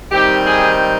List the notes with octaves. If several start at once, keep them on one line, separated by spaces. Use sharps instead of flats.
D#3 G3 C4 D#4 G4
G#4